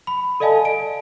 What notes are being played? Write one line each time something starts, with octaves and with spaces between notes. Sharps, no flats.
B5
A4 D5 D#5 F5 G#5 A5
D7